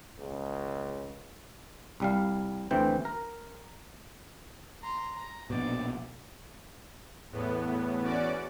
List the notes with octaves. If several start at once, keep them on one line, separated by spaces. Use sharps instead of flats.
C#2
C2 G3 F5
D2 E3 C4 G5
A#4
A#5 C6
A#5
A#1 B2 D5
E2 A2 B3
E2 C#4 F#4 D5 D6